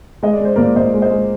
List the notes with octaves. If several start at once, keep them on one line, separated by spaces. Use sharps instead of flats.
G#3 D#5
D5
G#3 C5
A#2 A#4 D5
A#2 C5 D#5
G#3
C5 D#5
G#3